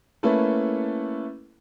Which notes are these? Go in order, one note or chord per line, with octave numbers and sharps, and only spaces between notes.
A3 A#3 C#4 E4 A4 B4